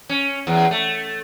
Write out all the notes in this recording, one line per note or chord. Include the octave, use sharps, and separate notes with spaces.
C#4
E2
A3